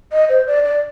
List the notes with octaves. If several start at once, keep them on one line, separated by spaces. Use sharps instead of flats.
D#5
C5
D5
D5